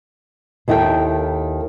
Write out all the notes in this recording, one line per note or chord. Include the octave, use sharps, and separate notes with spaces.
D#2 D#3 E4 A4 G5